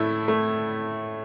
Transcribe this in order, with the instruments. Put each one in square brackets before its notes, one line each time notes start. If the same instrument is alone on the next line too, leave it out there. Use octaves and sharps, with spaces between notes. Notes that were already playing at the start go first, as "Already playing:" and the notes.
Already playing: [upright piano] A2 A3 E4
A3